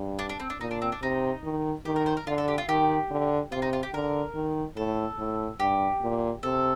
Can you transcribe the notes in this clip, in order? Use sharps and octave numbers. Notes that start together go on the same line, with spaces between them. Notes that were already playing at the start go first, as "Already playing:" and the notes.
Already playing: G2
D4
D4
C4
D4
A#2 D#4
D4
C4
D4
C3 D#4
D#3
D#3 G4
A#4
C5
A#4
D3 F4
A4
G4
F4
D#3 G4
D3
C3 F4
D#4
F4
G4
D3 A#4
D#3
A2 A4
A2
G2 G4
A#2
C3 A4